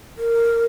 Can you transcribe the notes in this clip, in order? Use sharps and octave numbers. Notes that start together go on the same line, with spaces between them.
A#4